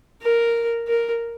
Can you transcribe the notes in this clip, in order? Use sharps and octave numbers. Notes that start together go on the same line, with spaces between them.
A#4
A#4